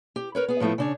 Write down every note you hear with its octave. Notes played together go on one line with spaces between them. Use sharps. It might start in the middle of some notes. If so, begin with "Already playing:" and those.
G4
A#4 B4 C#5
B3 G#4
A2 F3 A3 B3 E4
C#3 D4 C#5